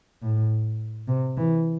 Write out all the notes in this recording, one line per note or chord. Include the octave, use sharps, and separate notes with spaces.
A2
C3
E3